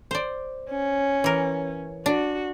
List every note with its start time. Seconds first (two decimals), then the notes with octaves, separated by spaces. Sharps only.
0.11 C5 D5
0.70 C#4
1.24 E3 A#4
2.06 D4 F#4